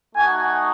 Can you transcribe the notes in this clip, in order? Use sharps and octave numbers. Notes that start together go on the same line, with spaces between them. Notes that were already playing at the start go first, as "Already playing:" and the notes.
A3 D#4 F#4 G#5